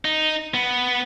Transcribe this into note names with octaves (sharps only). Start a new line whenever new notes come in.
D#4
B3